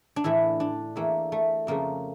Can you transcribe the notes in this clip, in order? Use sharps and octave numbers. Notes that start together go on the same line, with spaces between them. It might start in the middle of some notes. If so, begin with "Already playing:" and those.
D4
A2 E3 A3 E4
D4
E2 E3 A3 A#3
A3
F2 C#3 F3 A3 A#3